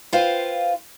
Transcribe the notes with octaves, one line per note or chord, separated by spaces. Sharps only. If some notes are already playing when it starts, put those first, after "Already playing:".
F4 B4 C5 F5 G5